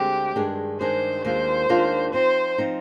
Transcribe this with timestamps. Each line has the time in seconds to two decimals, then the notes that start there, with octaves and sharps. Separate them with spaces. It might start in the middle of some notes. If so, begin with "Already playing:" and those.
Already playing: D2 D3 G#3 C4 G4
0.36 G2 D#3 G#3 D4 G#4
0.80 G2 D#3 G#3 D4 G#4 C5
1.25 D#2 D#3 G#3 D4 F4 C5
1.69 D#2 D#3 G#3 D4 F4
2.13 F3 C4 D#4 C5
2.58 F3 C4 D#4